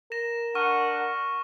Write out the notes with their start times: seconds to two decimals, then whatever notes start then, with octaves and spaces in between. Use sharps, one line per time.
0.12 A#4 A#6 E7
0.55 D4 F#5 C#6 F6 D#7